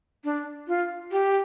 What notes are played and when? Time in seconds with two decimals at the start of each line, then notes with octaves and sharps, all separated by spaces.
0.24 D4
0.68 F4
1.12 G4